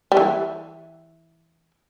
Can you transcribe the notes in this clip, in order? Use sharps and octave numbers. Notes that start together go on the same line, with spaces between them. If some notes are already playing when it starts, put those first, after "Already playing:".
G3
E3